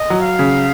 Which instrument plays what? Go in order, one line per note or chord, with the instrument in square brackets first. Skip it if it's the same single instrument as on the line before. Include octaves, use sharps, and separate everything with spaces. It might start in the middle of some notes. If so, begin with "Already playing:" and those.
Already playing: [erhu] D#5
[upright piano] F#3
[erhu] F5
[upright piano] C#3